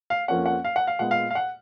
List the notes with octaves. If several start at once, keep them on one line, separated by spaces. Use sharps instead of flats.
F5
F2 F3 A#3 C#4 F#5
F#5
F5
F#5
F5
A#2 G#3 B3 F#5
F5
F5
F#5